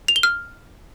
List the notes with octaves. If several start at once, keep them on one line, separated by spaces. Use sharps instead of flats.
F7
G7
F6